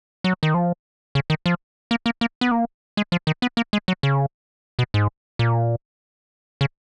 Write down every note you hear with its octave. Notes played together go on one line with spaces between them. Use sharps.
F#3
D#3
F3
C#3
D#3
F3
A#3
A#3
A#3
B3
A#3
G#3
F3
D#3
B3
A#3
G#3
F#3
C#3
B2
G#2
A#2
C#3